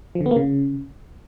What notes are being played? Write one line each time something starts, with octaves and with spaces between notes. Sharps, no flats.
F3
D3
B3
A#3
C#3